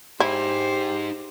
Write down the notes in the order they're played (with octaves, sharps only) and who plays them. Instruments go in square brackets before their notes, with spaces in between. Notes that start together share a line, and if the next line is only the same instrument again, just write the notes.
[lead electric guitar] D#4 G#4 [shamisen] E4 [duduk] G4 [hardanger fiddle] C5